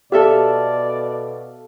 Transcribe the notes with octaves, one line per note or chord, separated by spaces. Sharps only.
B2 G4 A4 D5 E5 F5